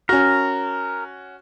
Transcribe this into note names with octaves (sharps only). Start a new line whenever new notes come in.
C#4 F#4 A#4